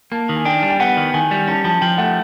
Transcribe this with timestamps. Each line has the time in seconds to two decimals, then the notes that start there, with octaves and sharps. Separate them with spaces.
0.11 A#3 A5
0.29 D#3
0.36 G#5
0.45 D4 G5
0.63 G3
0.70 G5
0.80 B3 F#5
0.97 D#3
1.14 D#3 G#5
1.31 G3
1.47 C#4 A5
1.64 F3 A5
1.81 F3 G5
1.98 A3 F#5